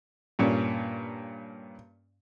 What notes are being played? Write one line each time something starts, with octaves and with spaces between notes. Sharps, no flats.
G2 A#2 C#4